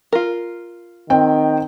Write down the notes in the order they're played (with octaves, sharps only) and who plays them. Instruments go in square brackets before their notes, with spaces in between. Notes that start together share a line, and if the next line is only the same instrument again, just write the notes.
[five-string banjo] F4 A#4
[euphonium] D#3 [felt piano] C4 G5